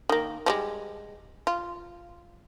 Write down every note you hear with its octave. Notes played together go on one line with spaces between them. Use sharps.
D#3 A#3
F3 G3 G#3
F4